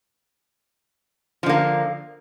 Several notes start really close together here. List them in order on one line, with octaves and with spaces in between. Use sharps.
F3 D3 A#3